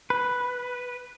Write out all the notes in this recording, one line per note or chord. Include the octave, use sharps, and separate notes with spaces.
B4